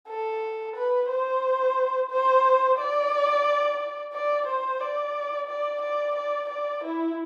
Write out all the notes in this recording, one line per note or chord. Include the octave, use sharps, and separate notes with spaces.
A4
B4
C5
C5
D5
D5
C5
D5
D5
D5
D5
D5
E4